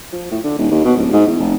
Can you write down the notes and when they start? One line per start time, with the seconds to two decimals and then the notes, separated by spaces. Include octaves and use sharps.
0.13 F3
0.31 A2
0.44 D3
0.58 D#1
0.72 D#2
0.85 B2
0.97 D1
1.13 G#2
1.27 E2
1.40 F1